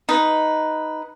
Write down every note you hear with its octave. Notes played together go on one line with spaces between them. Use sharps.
D#4 B4